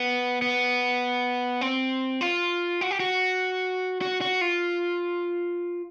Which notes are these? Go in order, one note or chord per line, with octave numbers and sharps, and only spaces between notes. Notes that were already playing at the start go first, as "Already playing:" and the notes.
Already playing: B3
B3
C4
F4
F#4
G4
F#4
F#4
F#4
F4